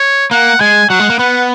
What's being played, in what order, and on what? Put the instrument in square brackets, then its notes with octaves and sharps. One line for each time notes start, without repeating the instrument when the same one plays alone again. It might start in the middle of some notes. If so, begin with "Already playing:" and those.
Already playing: [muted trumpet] C#5
[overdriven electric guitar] A#3 [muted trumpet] F#5
[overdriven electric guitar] G#3 [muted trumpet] G#5
[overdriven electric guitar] F#3 [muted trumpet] F#5
[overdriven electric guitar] G#3
A#3
[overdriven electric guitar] B3 [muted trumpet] F#5